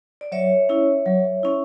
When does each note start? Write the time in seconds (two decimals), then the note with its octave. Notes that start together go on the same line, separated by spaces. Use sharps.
0.21 D5
0.32 F#3 C#5 E5
0.69 C#4 E4
1.06 F#3
1.43 C#4 E4